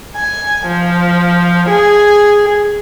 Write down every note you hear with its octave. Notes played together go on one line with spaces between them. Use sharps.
G#5
F3
G#4